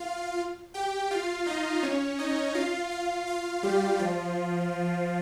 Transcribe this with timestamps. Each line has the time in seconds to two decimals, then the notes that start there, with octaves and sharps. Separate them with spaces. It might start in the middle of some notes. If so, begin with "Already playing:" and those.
Already playing: F4 F5
0.74 G4 G5
1.11 F4 F5
1.46 D#4 D#5
1.83 C#4 C#5
2.19 D#4 D#5
2.54 F4 F5
2.91 F4 F5
3.27 F4 F5
3.63 G3 G4
3.99 F3 F4